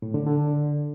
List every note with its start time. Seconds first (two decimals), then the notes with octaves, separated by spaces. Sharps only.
0.02 A2
0.14 D3
0.26 D3